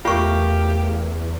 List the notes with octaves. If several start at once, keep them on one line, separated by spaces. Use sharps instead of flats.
E2 A3 F4 G4 A#4 F5 C#6